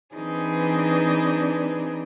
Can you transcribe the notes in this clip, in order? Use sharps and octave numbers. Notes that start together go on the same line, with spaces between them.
E3 C4 D4 D#4 G#4 B4